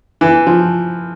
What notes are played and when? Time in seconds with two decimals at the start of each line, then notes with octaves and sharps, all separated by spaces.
0.21 E3
0.47 F3